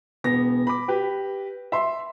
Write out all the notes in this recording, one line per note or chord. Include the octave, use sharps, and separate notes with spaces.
E1 B3 A#6
B5 D6
G4 B4
E5 C6